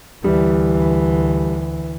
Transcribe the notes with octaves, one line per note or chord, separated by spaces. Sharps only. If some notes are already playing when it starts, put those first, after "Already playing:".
D2 E3 G3